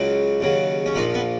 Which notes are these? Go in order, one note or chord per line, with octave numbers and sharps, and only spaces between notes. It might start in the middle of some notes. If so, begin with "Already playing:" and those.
Already playing: C#2 C#3 F#3
D#2 C#3 F#3
C#4
A#1 A#2 F3 D#4
B3